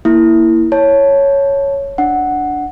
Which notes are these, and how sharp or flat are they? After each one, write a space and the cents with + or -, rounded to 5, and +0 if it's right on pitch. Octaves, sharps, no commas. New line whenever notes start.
A#3 +0 E4 +0
C#5 +0 A5 +0
D4 +0 F#5 +0